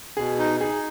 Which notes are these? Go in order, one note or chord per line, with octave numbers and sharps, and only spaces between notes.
B2 G#4
D#4
D#4 G#4